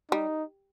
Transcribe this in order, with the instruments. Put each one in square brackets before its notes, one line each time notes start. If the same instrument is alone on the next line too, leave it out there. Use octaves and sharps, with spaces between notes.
[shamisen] G3 [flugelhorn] D#4